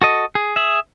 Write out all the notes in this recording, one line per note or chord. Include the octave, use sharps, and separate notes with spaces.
F#4 A4 D#5
G#4
G#4 E5